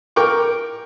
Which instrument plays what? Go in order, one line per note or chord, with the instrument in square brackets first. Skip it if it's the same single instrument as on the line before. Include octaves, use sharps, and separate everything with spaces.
[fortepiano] A#4 G5 C#6 D6